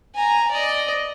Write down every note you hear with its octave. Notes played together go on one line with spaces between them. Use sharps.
G#5 A#5
D5 D#5